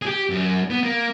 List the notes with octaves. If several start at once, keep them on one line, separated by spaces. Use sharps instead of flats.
G4 G#4
F#2
B3
A#3